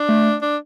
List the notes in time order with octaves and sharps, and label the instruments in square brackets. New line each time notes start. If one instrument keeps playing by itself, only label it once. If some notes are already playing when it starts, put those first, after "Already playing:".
Already playing: [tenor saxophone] D4
[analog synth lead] A3
[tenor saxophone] D4